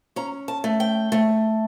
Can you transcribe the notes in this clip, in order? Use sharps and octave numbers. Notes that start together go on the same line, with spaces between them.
C#4 A#5
A5
A3
G5
A3